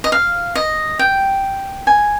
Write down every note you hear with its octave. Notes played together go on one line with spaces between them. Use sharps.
D#5
F5
D#5
G5
G#5